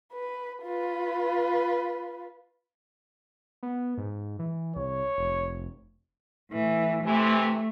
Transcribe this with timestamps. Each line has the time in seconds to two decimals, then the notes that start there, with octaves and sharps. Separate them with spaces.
0.13 B4
0.64 F4 B4
3.63 B3
3.98 G#2
4.39 E3
4.76 C2 C#5
5.18 F1
6.51 A2 E3
7.04 C3 E3 A3